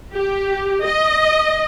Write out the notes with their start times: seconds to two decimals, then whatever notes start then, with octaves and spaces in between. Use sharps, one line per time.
0.13 G4
0.83 D#5